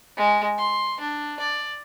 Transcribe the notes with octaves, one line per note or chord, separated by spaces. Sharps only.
G#3
C6
D4
D5